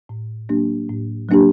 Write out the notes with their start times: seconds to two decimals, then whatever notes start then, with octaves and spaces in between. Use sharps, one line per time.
0.09 A2
0.49 F#3 A#3 D4 G4
0.89 A2
1.29 F#3 A#3 D4 G4